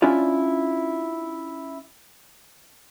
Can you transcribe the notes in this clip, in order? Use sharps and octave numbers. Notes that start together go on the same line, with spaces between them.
C#4 D4 E4 F4 D5